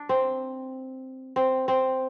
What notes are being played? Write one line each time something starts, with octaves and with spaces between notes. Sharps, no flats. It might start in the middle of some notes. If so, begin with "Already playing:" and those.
Already playing: D4
C4
C4
C4